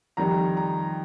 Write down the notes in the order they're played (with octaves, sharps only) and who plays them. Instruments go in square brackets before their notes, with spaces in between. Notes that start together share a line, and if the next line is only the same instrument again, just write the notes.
[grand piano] F2 D#3 G3 A#5
A#5